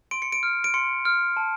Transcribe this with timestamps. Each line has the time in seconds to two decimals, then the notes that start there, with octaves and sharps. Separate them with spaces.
0.11 C6 D7
0.22 C#7
0.32 D7
0.43 F6
0.64 D7
0.74 C6 C#7
1.05 F6
1.37 A5